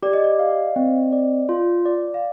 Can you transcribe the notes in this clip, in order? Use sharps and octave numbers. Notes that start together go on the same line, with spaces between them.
G4 D5
D#5
D5
F5
C4
D5
F4
D5
F5